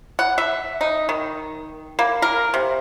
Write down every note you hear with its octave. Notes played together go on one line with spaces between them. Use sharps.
F#5
E5
D#4
D#3
A#3
A#4
C3